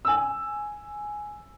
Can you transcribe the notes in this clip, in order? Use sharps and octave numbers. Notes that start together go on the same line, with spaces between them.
G#5 E6